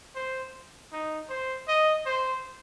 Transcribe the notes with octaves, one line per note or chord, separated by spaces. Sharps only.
C5
D#4
C5
D#5
C5